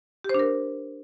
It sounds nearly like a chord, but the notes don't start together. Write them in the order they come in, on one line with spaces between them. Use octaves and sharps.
G4 C5 D4 A#4